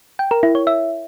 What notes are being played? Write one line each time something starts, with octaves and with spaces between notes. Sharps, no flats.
G5
A#4
E4
C#5
E5